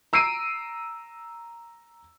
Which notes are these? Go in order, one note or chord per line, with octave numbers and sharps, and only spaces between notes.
A#5 E6 C7 D7 D#7